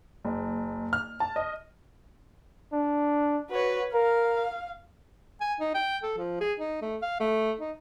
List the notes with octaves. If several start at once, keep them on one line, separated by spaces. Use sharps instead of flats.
F#1
F6
A5
D#5
D4
F#4 B4 C#5
A#4 F5
G#5
D#4
G5
A4
F3
G#4
D#4
A3
F5
A3
D#4